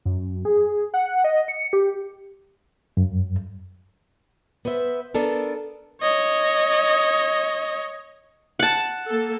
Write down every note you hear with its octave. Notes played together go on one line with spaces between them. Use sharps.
F#2
G#4
F#5
D#5
C#7
G4
F#2
B3 B4 C5 E5
B3 D4 A4 A#4
C#5 D#5
F#5 A5
A#3 A4